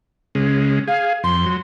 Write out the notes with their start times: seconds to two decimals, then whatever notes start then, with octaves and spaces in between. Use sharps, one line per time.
0.35 C#3 G#3
0.87 G#4 F5
1.23 F2 C6
1.46 F#3